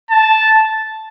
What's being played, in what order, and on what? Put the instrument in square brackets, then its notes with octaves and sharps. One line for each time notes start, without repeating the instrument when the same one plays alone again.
[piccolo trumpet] A5